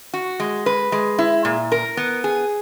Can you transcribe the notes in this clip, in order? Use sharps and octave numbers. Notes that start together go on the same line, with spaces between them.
F#4
G#3
B4
G#3
E4
A#2
A#4
B3
G#4